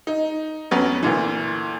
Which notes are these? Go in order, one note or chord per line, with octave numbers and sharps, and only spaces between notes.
D#4
F2 F#3 B3 C#4
D2 A#2 E3